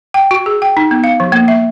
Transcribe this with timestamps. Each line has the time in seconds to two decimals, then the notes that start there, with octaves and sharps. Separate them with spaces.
0.14 G5
0.31 F#4
0.46 G#4
0.62 G5
0.77 D#4
0.91 B3
1.04 F5
1.20 F3
1.32 A#3
1.48 E5